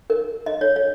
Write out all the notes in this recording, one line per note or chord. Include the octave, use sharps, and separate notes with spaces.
A#4
D#5
C#5
C#5